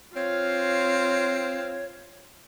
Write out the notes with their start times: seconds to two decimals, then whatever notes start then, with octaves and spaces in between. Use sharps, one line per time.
0.15 C4 F4 C#5 F5